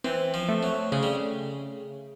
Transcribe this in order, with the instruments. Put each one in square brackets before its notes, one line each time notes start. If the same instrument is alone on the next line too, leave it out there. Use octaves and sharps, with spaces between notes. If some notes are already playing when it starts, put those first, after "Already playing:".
[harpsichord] E3 [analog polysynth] C4
[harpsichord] F3
[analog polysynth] A3
[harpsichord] F#3
[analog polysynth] C#3 [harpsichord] G#3
[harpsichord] G3